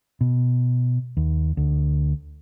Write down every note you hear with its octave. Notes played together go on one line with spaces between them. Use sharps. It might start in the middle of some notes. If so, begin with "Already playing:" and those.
B2
D#2
D2